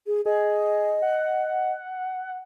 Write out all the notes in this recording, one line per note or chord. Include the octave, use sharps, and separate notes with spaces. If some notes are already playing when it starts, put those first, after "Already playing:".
G#4
G#4 D#5
F#5